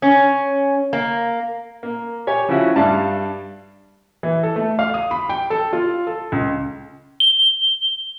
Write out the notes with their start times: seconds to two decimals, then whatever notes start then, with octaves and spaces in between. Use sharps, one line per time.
0.02 C#4
0.93 A#3
1.83 A#3
2.27 G4 C#5 G#5
2.49 C#3 F3 C#4 E4 F#4
2.76 G2 G3 E5 F5 A5
4.23 E3
4.43 A4
4.56 A3
4.79 F5
4.94 D#6
5.11 B5
5.29 G5
5.50 A4
5.73 F4
6.07 A4
6.32 C#2
7.20 G7